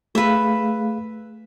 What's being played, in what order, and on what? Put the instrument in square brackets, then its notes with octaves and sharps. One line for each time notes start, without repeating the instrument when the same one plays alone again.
[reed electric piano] A3 G#4 F5 [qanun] B4 E5